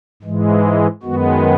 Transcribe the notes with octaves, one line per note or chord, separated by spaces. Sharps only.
G#2 E3 G#3
F#2 D#3 G#3 B3 F#4